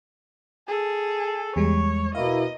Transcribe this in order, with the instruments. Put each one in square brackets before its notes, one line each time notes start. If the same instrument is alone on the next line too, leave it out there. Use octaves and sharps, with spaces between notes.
[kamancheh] G#4 A4
[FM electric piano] E2 G3 G#3 [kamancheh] C#5
[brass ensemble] B2 A#3 E4 [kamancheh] D#5 [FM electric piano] F5